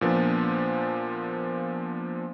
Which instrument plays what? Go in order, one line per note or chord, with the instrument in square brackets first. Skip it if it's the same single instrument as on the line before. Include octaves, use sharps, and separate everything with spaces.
[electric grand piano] A#2 F3 B3 D4